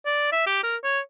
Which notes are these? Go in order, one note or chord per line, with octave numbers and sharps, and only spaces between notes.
D5
E5
G4
A#4
C#5